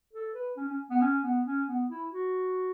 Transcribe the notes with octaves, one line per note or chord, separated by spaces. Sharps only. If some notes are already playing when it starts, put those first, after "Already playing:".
A4
B4
C#4
C#4
B3
C#4
B3
C#4
B3
E4
F#4